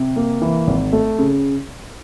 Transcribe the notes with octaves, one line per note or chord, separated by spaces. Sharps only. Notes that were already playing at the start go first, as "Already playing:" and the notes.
Already playing: C3
A#3
E3
G#1
A3
C#3